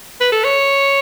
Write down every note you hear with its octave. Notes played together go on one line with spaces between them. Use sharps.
B4
A4
C#5